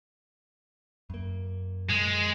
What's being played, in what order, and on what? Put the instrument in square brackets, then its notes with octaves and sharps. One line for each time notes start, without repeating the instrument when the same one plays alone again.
[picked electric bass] F#2 A#3
[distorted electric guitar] G#3